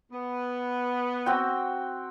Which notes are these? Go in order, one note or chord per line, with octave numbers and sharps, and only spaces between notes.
B3
C4 F#4 G5